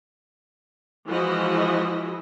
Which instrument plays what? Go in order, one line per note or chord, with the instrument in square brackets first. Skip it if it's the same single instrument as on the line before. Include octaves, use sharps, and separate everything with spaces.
[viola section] E3 F3 G#3 E4 F#4 D#5